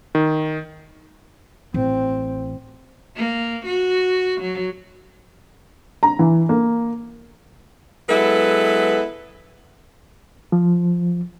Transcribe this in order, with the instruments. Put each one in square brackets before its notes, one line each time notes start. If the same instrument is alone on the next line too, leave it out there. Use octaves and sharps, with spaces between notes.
[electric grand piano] D#3
[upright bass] A1 [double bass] C4
[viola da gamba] A#3
F#4
F#3
[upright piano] A#5
E3
A#3
[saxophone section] F#3 G#3 B3 E4 A4 B4
[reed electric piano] F3